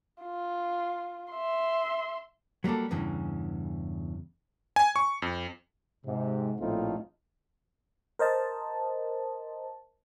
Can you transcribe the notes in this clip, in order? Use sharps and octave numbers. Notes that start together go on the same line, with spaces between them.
F4
E5 C6
F#3 G3 A#3 G4 A4
E2 G2 C#3 E3
G#5
C#6
F2
G#2 C3
A#1 A2 A3 C4 D#4 F4
A#4 C5 D#5 A5